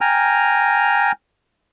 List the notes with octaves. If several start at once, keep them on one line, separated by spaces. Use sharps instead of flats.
G5 G#5 A#5 F6